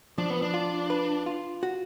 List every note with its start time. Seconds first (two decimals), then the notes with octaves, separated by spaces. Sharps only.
0.18 F3 D4
0.30 B3
0.42 D4
0.54 F4
0.90 B4
1.26 F4
1.63 F#4